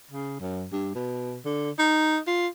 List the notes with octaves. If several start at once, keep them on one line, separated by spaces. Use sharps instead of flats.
C#3
F#2
G2
B2
D3
D#4
F4